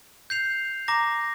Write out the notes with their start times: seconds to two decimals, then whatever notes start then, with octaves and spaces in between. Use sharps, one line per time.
0.30 G6 C7 F7
0.88 A#5 D6 A#6